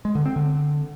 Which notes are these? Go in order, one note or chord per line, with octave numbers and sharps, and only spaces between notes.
G#3
D3
C4
D3